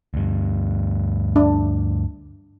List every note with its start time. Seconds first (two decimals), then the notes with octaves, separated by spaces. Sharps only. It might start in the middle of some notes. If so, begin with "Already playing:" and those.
0.14 D2 G2
1.36 D4